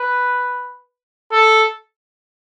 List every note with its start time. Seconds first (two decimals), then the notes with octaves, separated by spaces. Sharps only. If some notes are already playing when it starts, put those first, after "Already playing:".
Already playing: B4
1.32 A4